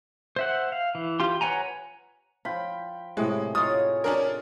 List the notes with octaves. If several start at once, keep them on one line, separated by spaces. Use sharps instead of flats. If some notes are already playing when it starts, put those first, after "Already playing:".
C5 E5 F#5
F5
E3
F4 G4 C6
B4 C#5 F#5 G#5 A#5
F3 F4 G5 B5
A2 C3 G#3 G#4 D#5
D#4 F4 C#5 D#6
C#4 D4 A#4